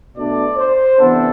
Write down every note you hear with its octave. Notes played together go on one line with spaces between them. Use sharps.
B2 A3 D4 D5
C5
C3 E3 B3 D4 A4